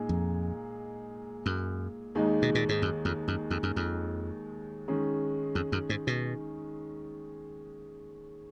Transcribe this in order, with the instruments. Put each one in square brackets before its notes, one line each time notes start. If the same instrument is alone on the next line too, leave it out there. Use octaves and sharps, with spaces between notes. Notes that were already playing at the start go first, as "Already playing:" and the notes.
Already playing: [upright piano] A#2 G#3 D#4 G#4
[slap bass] F2
F#2
[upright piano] D#2 D#3 G#3 D#4
[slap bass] B2
A#2
G#2
F#2
F2
F#2
F2
F#2
F2
[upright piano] D#3 G#3 C#4
[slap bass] F2
F#2
G#2
B2